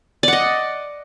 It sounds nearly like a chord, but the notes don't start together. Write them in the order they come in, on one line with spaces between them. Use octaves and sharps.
D5 F#5 D#5